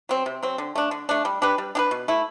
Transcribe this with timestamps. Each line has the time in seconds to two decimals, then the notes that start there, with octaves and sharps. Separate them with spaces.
0.09 F#3 C4
0.26 C3
0.43 F#3 C4
0.58 D3
0.75 A3 D4
0.91 D3
1.09 A3 D4
1.25 G3
1.42 D4 G4 B4
1.58 G3
1.75 D4 G4 B4
1.91 B2
2.08 A3 E4